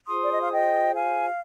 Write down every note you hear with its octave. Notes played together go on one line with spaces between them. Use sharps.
F4 G#4 C5 C6 D#6
D5
D#5
F5
D#5 G5
F5 G#5